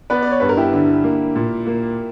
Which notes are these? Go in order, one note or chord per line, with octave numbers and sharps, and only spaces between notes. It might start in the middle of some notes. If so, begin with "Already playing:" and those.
B3 B4 D5
D5
C#5
G2 B4
A#4
E4 G4
D3
A#3
A#2
A#3